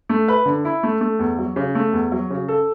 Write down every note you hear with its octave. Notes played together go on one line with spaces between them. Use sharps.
A3
B4
D3
E4
A3
A3
E2
F#3
C#3
A3
E2
F#3
C#3
A4